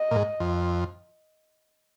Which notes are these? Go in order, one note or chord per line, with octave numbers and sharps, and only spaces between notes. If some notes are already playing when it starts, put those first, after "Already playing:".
Already playing: D#5
A#2
G#2
F2